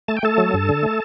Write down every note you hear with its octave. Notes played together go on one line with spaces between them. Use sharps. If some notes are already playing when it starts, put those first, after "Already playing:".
A3 A5
G5
A3 A4 A5
F#3
G2
D3
A3